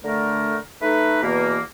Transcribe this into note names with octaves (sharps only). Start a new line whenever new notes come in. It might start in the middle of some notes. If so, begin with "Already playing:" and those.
D3 A3 A#4
A3 D#4 B4
E2 B2 E3 A#3